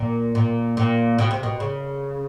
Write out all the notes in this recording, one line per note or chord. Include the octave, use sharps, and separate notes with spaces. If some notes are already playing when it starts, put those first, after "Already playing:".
Already playing: A#2
A#2
A#2
B2
C3
B2
C#3